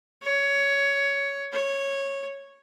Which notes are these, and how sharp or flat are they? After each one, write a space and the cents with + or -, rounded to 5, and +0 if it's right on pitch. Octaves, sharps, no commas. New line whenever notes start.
C#5 +15
C#5 -10